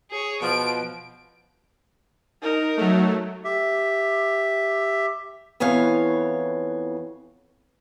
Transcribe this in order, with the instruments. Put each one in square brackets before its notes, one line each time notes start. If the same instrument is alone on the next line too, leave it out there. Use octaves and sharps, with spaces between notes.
[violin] G#4 C#5
[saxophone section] B2 F3 [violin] D7
[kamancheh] D#4 A#4
[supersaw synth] F#3 A3
[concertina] G4 E5
[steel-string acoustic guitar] F2 E3 B3 C#5 F5